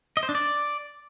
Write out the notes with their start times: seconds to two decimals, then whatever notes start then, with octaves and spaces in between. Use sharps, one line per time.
0.17 D#5
0.23 C5
0.29 D4
0.35 D5